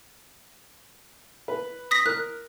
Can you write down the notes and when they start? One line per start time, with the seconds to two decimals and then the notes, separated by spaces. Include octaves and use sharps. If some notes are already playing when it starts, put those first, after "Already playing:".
1.48 B4
1.91 D#6 A#6 B6
2.06 A#4 F#6